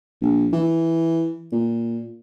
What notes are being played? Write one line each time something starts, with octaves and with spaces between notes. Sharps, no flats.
A#1
E3
A#2